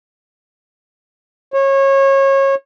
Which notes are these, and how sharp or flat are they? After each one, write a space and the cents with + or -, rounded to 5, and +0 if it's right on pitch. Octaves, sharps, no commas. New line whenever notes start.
C#5 -25